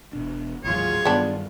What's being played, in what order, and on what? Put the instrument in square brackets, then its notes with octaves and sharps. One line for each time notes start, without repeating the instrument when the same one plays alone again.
[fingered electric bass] E1 B2 D4
[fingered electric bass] A1 D#2 G#2 [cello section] F#3 F4 G#4 [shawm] C#5
[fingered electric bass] G2 D#3 G3 [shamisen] B3 D4